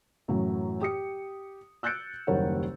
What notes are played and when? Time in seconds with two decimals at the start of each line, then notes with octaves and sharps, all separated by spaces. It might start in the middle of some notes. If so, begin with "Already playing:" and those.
0.28 F#2 A2 E3 F#3
0.81 G4 D#6 C#7
1.83 E6 F#6 G6 A6 C#7 D7
2.27 F#1 D#2 G3 A#4 C#5 F#5